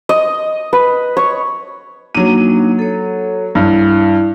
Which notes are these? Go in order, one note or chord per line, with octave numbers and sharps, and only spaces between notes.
D#5
B4
C#5
F#3 A#3 D4 D#4 D#7
A4 C#5
G2 E4